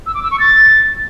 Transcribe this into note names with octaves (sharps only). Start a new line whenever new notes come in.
E6
D6
E6
C#6
A6